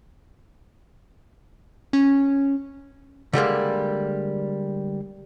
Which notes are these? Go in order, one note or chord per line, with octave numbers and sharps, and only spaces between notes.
C#4
D3 G3 G#3 A#3